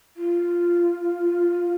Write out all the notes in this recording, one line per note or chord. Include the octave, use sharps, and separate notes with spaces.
F4